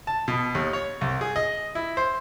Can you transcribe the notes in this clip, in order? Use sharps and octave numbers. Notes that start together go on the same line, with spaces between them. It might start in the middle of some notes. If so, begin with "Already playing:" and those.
A5
B2
D#2
C#5
C2
G#4
D#5
E4
C5